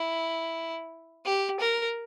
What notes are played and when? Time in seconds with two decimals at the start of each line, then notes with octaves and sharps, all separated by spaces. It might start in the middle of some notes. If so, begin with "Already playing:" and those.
Already playing: E4
1.25 G4
1.60 A#4